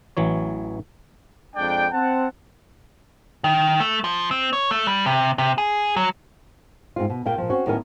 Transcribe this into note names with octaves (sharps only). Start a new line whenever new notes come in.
A1 E3 F#3 C#5
F2 G#3 D4 D5 G5
C4 F#5 A5
D#3
A3
F3
C4
C#5
A3
G3
C3
C3
G#4
F#3
G#2 C4 F4
B2
A#2 A#3 F4 G5
A#2 F3
C4 C#4 F#4
A2 D#3 F#3 B3 C#4 A#4